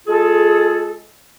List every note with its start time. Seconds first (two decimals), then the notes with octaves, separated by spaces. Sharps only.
0.07 G#3 F4 G#4 A4